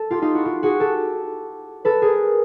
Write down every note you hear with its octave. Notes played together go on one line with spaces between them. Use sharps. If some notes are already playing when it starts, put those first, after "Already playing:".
Already playing: A4
F4 G4
D#4 F4
E4 F#4
F4 G4
F#4 G#4
G4 A4
A4 B4
G#4 A#4